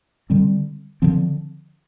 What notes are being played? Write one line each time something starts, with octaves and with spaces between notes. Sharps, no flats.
D3 G3 C4
D3 F3 C4